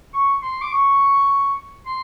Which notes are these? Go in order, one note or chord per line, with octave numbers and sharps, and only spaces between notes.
C#6
C6
D6
C#6
C6